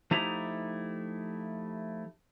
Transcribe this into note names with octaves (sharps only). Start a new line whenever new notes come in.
F3 A3 D#4 E4 G4 A#5